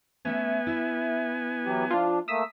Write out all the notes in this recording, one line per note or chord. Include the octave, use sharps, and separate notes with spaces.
A3 B3 C#4 E5 G#5
E4 E5
E3 F#3 G4
F3 D4 F4
A3 A#3 D#6 E6 B6